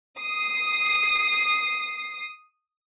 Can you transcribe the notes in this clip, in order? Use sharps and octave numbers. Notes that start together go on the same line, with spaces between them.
D#6 C7